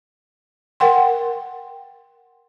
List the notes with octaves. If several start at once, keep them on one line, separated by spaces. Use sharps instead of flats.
A#4 F#5 G5 C6